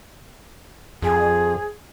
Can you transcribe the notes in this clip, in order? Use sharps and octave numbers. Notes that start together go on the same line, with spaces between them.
F2 G#4